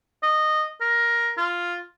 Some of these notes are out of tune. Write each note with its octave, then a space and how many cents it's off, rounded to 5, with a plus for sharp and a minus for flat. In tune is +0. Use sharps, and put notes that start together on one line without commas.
D#5 -15
A#4 +10
F4 +0